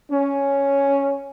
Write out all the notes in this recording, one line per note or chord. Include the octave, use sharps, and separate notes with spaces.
C#4